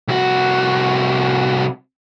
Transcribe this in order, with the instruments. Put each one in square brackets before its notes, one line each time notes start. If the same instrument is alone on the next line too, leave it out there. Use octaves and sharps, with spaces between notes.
[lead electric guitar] C2 F#4